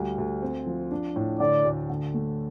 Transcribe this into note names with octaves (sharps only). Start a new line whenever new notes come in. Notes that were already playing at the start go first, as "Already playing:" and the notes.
Already playing: D2 G3
D2
C4
F3
D4
A2
D3 D5
D2
D3
A3